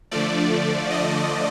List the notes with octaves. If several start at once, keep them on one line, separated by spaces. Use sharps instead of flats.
D3 F3 A3 D5
D#5